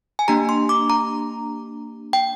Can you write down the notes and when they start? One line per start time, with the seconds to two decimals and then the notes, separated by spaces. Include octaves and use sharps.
0.19 G#5
0.28 A#3 D4 G4 A#5
0.49 C6
0.69 D6
0.90 A#5
2.13 G5